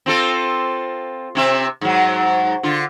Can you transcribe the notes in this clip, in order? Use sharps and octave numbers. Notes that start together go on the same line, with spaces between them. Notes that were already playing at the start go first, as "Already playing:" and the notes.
C4 F4 A4
C3 C4 E5
G#2 F#3
D3 F4